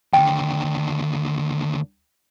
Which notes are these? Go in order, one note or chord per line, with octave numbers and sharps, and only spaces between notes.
D#2 D3 G5